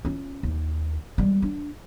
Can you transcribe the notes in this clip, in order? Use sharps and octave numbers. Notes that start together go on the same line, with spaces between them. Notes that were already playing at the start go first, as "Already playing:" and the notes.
C#4 F4
D#2
G3 G#3
D4